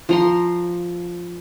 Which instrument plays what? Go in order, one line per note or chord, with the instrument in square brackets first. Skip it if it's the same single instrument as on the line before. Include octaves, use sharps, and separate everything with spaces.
[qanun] F3 A#5 C6